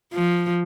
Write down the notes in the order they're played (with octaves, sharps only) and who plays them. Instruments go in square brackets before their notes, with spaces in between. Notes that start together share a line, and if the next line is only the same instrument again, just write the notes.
[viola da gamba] F3